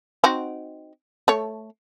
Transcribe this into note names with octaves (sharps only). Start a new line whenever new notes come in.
C4 D#4 F#4
A3 C#5